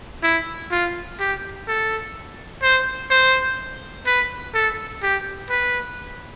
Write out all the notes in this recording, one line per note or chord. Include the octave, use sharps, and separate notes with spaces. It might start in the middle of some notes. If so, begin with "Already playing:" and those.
E4
F4
G4
A4
C5
C5
B4
A4
G4
B4